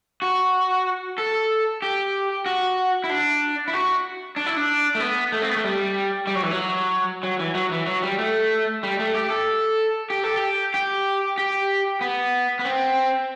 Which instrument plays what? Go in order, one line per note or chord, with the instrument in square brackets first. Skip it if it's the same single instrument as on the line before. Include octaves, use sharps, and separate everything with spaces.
[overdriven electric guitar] F#4
A4
G4
F#4
E4
D4
E4
F#4
D4
E4
D4
A3
B3
A3
C4
B3
A3
G3
G3
F#3
E3
F#3
F#3
E3
F#3
E3
F#3
G3
A3
G3
A3
G4
A4
G4
A4
G4
G4
G4
B3
B3
C4